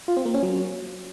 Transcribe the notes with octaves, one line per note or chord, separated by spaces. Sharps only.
F4
C4
A#3
C#4
F#3